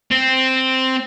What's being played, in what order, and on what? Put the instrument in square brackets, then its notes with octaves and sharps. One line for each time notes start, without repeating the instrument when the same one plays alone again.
[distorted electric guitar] C4